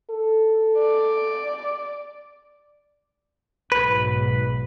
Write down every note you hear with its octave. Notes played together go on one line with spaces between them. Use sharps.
A4
D5
B1 G#2 B4